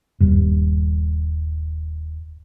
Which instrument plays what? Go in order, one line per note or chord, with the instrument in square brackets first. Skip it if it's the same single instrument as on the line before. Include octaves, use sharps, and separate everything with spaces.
[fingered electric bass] D#1 G2